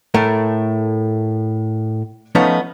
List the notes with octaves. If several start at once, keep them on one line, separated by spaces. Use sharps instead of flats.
A2 A3 A#4
F3 A3 B3 C#4 D#4